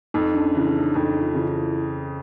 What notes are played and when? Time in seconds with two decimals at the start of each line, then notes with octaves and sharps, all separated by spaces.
0.14 F2 D#4
0.35 D4
0.41 C#4
0.55 C#3 E3
0.69 D4
0.76 D#4
0.83 D4
0.94 F2 D#4
1.22 F4
1.35 C#3 E3 F4
1.47 E4